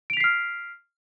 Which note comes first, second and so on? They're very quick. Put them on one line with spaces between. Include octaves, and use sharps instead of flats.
D7 F7 B6 C7 F6